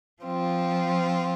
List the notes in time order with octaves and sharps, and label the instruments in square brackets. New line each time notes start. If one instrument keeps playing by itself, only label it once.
[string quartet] F3 C4 F4